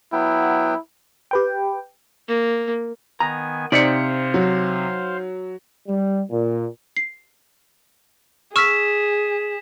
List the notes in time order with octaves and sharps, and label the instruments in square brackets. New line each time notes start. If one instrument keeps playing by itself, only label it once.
[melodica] F#3 B3 G5 [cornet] E4
[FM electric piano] G4 B4 G5
[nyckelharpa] A#3
[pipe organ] D#3 B3 G#5 [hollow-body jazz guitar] A#5
[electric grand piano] C3 B6 C#7 [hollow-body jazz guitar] D#4 D5 [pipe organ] C5 F5
[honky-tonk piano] F#3
[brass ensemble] G3
A#2
[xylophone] C7
[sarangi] G#4 [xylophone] C#6 E6 F6 [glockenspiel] B6 E7